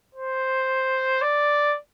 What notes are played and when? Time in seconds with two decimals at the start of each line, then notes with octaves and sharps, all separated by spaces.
0.15 C5
1.22 D5